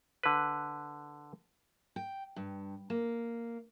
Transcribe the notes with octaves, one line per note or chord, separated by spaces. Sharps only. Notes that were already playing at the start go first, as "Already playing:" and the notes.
D3 B4
G5
G2
A#3